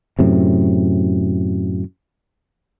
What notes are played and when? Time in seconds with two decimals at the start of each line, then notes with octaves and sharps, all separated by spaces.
0.19 F#2 A2 C3